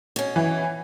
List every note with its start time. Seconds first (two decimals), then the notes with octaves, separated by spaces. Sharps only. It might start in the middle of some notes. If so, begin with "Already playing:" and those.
0.16 B2 C#4
0.36 E3